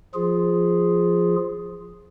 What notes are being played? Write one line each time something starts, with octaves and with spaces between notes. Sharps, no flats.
F3 F4 G#4